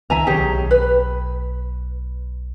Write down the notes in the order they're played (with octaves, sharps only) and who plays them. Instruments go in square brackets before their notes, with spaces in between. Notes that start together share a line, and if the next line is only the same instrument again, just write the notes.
[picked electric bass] C#2 D#3 [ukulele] E5 G#5 A#5
[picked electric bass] B1 [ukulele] G4 G#4 C#5
[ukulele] B4